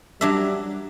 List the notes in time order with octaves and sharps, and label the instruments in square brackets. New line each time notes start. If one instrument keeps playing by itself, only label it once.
[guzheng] F#3 D4 E5 [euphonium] G3